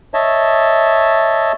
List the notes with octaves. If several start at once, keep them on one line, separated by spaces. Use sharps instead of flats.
C#5 D#5 E5 A5